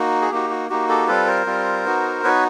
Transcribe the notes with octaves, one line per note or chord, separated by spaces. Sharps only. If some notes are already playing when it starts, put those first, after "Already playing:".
Already playing: A#3 D#4 F#4
G#4
A#3 D#4 F#4 G4
F#4
A#3 D#4 F#4 G4
G4 A4
G3 C4 F4 A4 B4
A#4 C5
G3 C4 F4
B3 D#4 F#4
B3 D#4 F#4 B4 C#5